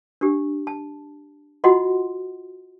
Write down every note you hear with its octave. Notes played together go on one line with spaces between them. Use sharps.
D4 G4
A5
F4 F#4 D#5 F#5 C6